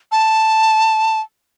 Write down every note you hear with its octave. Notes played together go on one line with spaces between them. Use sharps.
A5